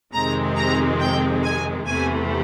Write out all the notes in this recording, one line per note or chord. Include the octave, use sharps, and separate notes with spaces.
F2 C3 D#3 G#3 C4 A#5
A#5
G5
G#5
E2 C3 E3 A3 G#5